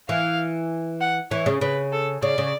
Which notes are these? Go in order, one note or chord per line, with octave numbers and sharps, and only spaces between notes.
E3 F5
F#5
E3 C#5
C#3
C#3 B4
A4
C#3 D5
C#3